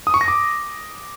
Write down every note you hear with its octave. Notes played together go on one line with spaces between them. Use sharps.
D#6
C#6
A#6
D6